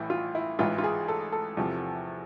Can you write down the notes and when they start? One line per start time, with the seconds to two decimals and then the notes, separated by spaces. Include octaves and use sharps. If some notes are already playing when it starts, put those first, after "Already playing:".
Already playing: A1 A2 E3 E4
0.10 F4
0.35 E4
0.59 A1 G#2 E3 F4
0.78 F4
0.84 G#4
1.08 A4
1.32 A4
1.57 E2 C3 F3